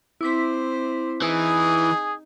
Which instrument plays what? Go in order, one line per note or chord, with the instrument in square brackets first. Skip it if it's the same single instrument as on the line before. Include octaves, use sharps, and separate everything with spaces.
[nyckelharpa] C4 C5 [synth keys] E4 D6 B6
[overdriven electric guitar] E3 [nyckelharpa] D#4 [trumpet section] G#4